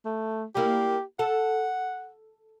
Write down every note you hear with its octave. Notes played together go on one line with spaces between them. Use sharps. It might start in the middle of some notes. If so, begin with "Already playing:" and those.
A3
G3 A#3 E4 G4
A4 F#5